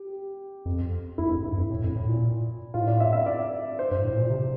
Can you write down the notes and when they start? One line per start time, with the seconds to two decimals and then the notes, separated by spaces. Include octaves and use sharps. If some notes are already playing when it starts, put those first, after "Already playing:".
Already playing: G4
0.65 F2
1.18 E2 E4
1.32 F2
1.44 G2
1.57 F2
1.70 A2
1.84 F2
1.96 A2
2.09 A#2
2.74 A2 F4
2.87 D5
3.00 E5
3.13 E5
3.26 D5
3.79 C5
3.91 G2
4.05 A2
4.17 A#2
4.30 C3